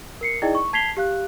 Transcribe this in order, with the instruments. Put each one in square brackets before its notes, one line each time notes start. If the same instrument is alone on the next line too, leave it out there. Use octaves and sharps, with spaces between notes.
[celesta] A#4 C7 C#7
D#4 E4 G#4 D5 D#5 G5
C#6
A5 G#6 B6 C7 F7 G7
G4 F5 F#6